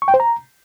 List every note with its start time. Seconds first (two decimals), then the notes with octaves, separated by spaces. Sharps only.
0.02 C#6
0.08 G5
0.14 C5
0.20 A#5